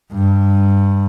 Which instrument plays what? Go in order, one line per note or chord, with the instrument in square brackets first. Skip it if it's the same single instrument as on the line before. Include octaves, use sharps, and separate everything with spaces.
[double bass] G2